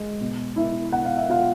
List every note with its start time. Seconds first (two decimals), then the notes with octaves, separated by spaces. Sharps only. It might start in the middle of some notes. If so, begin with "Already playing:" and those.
Already playing: G#3
0.21 B2
0.56 B2 E4 E5
0.92 B2 F#5
1.05 F5
1.17 E5
1.27 B2 F4 F5